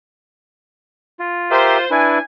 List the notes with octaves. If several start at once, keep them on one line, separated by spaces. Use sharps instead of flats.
F4
G4 A#4 C5 E5
D4 E4 B4 G#5